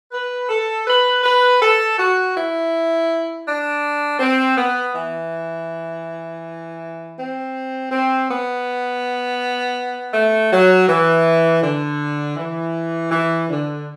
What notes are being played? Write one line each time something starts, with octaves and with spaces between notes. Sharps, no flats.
B4
A4
B4
B4
A4
F#4
E4
D4
C4
B3
E3
C4
C4
B3
A3
F#3
E3
D3
E3
E3
D3